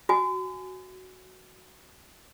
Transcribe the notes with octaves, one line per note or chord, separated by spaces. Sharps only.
F#4 G#5